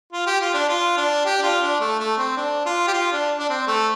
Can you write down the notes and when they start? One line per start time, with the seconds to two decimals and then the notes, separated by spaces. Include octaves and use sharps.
0.13 F4
0.26 G4
0.41 F4
0.54 D4
0.69 F4
0.97 D4
1.25 G4
1.39 D4
1.43 F4
1.61 D4
1.80 A3
1.99 A3
2.18 C4
2.37 D4
2.65 F4
2.87 G4
2.94 F4
3.12 D4
3.38 D4
3.50 C4
3.67 A3